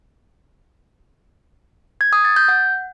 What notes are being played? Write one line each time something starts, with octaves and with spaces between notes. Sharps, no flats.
G#6
D#6
A6
G6
F#5